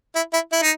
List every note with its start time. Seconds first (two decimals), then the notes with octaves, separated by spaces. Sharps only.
0.16 E4
0.33 E4
0.52 E4
0.62 D#4